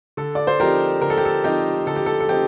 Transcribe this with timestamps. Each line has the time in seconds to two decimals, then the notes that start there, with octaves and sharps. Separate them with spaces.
0.17 D3 A4
0.35 D5
0.47 C5
0.60 F3 C4 D#4 G4 A#4
1.02 D3 A#4
1.10 A4
1.18 G4
1.25 A4
1.44 F3 C4 D#4 G4
1.87 D3 A4
1.96 G4
2.06 A4
2.20 A4
2.28 F3 C4 D#4 G4